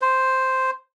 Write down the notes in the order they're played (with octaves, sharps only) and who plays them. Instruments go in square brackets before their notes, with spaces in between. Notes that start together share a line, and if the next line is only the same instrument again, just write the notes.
[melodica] C5